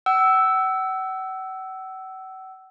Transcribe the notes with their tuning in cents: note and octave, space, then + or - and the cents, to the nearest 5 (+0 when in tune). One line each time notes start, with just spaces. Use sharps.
F#5 +40 E6 +0